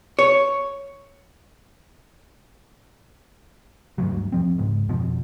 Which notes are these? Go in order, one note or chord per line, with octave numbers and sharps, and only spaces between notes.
C#5
D2 G2 F3 F#3
E2 F3 C4
C#2 G#2
F2 B2 F3